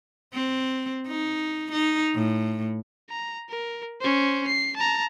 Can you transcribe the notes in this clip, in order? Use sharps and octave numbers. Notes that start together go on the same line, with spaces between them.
C4
D#4
D#4
A2
A#5
A#4
C#4 C5
C7
A5 A#5